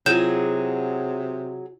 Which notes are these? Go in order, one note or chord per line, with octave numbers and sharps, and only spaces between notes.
C3 F#3 E4 F4 G#4 G6 E7